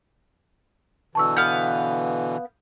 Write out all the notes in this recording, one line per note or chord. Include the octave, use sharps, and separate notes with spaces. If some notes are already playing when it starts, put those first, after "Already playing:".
B2 D3 E3 A5 C#6 E6
B3 F5 G6